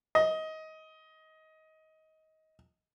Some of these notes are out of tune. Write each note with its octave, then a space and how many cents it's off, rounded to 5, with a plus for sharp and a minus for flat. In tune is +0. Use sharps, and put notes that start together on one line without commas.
D#5 +20